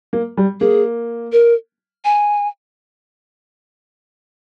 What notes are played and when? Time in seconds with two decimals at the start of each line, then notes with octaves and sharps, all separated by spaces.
0.13 A#3
0.37 G3
0.61 A#3 G#4
1.32 A#4
2.05 G#5